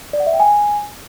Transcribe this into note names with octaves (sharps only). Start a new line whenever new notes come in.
D5
F#5
E5
G5
G#5